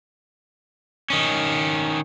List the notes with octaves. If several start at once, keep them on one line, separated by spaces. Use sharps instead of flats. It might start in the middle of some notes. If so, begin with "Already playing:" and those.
D#3 C#4